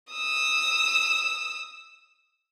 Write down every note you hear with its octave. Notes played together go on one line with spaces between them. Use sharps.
D#6 E6